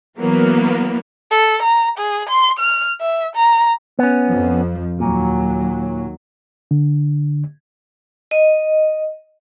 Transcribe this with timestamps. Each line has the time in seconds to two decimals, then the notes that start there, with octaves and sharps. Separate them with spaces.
0.17 E3 F#3 A#3 B3 A#4
1.31 A4
1.63 A#5
1.98 G#4
2.30 C6
2.59 F6
3.01 E5
3.36 A#5
3.99 B3 C#4
4.30 F2 F3
5.00 D#2 A#2 F#3
6.71 D3
8.31 D#5